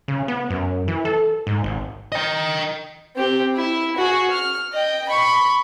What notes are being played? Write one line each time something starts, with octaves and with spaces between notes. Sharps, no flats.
C#3
B3
F#2
E3
A4
G#2
G#1
D#5 G5
C4 G4
E4 E5
F#4 G#4
F6
D#5 G5
B5 C#6